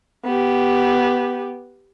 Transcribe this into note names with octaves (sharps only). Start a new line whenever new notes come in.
B3 G4